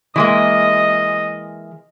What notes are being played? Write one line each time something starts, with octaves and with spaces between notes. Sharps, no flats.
E3 G#3 A#3 D#5